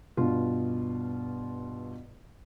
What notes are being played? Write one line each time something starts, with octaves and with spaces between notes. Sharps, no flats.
G2 B2 F4